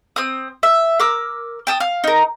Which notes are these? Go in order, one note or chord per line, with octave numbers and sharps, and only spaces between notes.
C4 D#6
E5
A#4 D6 E6
G5 A5 D#6
F5
D#4 A#4